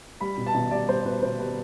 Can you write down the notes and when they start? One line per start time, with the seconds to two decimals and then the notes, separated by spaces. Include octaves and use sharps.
0.21 G3 B5
0.37 B2
0.46 A5
0.55 B2
0.71 G3 D5
0.89 G3 C5
1.05 B2 B4
1.22 B2 C5
1.39 G3 B4